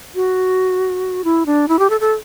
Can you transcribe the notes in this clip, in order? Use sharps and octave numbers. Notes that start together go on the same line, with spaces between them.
F#4
E4
D4
E4
G4
A4
A4